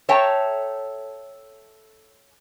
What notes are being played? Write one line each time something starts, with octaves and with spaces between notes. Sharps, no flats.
A4 C#5 E5 G5 A5 A#5